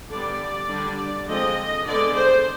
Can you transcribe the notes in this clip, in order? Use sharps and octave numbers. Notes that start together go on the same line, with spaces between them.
D3 G3 B3 D5
D3 G3 D4
D3 F3 G#3 C4 D#5
D3 G#3 B3 D5
C5